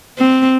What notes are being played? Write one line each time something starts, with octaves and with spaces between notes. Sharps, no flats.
C4